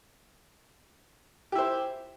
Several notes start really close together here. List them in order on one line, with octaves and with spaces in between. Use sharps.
G4 E4 C5